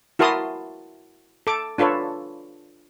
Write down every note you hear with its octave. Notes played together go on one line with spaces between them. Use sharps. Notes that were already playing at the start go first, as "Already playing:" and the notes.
E4 F#4 A#4 A5 C6 D#6
A4 D6
D4 F4 A4 B4 C#5